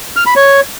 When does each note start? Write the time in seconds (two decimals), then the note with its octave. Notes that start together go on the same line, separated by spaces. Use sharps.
0.16 F6
0.26 B5
0.36 C#5